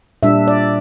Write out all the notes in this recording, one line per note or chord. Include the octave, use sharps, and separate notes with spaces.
A#2 G3 D4 E5
D5